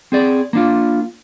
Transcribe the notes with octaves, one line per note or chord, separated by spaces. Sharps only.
C4 G#4 D5
A#3 D4 F4